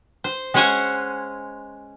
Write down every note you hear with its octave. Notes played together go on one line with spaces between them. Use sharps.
C5
G#3 C#4 C5 F#5 G#5